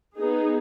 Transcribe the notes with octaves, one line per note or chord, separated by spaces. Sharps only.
B3 D#4 G#4